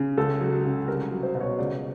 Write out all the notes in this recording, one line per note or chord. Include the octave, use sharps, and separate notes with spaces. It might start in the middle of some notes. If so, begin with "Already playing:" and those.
Already playing: C#3
C#2 A4
F#3
C#3
C2 A#4
F#3
C5
B2
C#5
C#2 D5